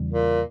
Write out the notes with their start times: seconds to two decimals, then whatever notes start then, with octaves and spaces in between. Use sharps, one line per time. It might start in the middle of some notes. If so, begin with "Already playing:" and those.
Already playing: E2 C#3 E3 G3
0.10 A#2